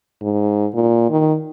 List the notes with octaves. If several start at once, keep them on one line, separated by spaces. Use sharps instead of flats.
G#2
A#2
D#3